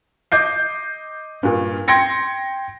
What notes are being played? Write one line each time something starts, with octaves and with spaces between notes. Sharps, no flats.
D#5 D6 G6 C7
G2 A#2
G5 C6 G#6 A#6 C#7